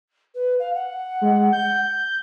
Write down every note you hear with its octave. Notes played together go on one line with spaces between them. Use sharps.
B4
F5
F#5
G#3
G6